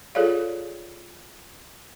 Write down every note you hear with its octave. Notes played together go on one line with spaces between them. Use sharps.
F4 G#4 A4 C#5 D5 F5